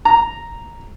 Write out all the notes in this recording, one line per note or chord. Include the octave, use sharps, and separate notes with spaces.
A#5